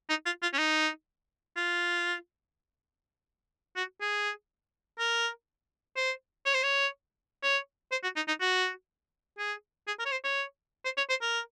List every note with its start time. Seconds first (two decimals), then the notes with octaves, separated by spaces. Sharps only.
0.10 D#4
0.26 F4
0.42 F4
0.53 C#4
0.59 D#4
1.56 F4
3.76 F#4
4.01 G#4
4.99 A#4
5.97 C5
6.45 C#5
6.54 C5
6.63 C#5
7.43 C#5
7.92 C5
8.03 F#4
8.16 D#4
8.28 D#4
8.40 F#4
9.38 G#4
9.87 G#4
10.00 A#4
10.06 C#5
10.12 C5
10.24 C#5
10.85 C5
10.97 C#5
11.10 C5
11.22 A#4